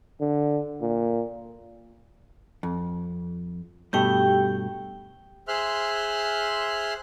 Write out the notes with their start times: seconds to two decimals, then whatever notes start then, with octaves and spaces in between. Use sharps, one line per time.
0.21 D3
0.81 A#2
2.63 F2
3.93 G2 B2 A3 G4 G5
5.48 G#4 C5 E5 C6 F6 F#6